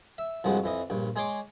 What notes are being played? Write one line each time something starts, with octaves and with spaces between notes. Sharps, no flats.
E5
C2 G2 F3 G#3 F#4
F2 E3 D#5
A#1 G2
G#3 G#4 C#5 C6 D6